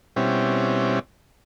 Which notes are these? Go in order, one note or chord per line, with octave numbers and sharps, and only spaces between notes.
B2 G3 C4 C#4 E4